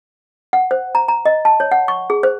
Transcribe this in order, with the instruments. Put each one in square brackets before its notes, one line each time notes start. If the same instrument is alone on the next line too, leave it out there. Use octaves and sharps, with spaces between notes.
[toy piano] F#5
C5
A#5
A#5
D#5
A5
C#5
F#5
C#6
G#4
C5